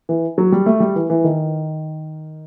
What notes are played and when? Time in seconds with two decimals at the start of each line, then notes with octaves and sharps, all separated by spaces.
0.09 E3
0.38 F#3
0.52 G3
0.66 A3
0.80 G3
0.96 E3
1.10 E3
1.24 D#3